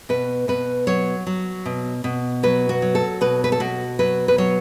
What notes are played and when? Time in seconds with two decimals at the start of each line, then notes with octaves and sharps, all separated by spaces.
0.09 B2 B4
0.48 B2 B4
0.87 F#3 C#5
1.27 F#3
1.65 B2
2.04 B2
2.43 F#3 B4
2.69 F#4
2.82 F#3
2.95 A4
3.21 B2 B4
3.44 B4
3.52 A4
3.60 B2 F#4
3.99 F#3 B4
4.28 B4
4.38 F#3 C#5